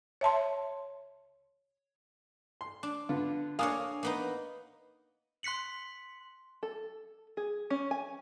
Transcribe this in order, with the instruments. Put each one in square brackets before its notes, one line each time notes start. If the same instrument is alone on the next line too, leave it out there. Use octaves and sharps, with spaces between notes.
[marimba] C#5 E5 A5 C6
[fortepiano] C6
[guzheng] D4
[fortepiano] D3 B3 F4
[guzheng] A#3 D4 C#5 [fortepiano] F5 G#5 D#6
[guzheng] A#3 B3 D#4
[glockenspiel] C6 F#6 B6 C#7 F#7
[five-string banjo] A4
G#4
C#4
G#5